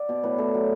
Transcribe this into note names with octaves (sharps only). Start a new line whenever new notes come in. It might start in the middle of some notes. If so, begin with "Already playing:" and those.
Already playing: D5 E5 F#5
B2
A2 B4
A2 A4
F#3